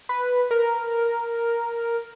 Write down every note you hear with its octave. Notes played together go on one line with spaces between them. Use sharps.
B4
A#4